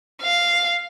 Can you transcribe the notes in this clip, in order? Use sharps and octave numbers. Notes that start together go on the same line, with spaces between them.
F5